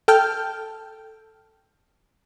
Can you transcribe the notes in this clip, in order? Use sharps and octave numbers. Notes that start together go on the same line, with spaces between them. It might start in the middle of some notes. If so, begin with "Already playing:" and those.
A4 G5 A5 F6 G6